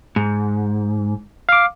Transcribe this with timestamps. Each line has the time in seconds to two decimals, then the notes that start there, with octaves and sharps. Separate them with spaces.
0.16 G#2
1.49 F5 D6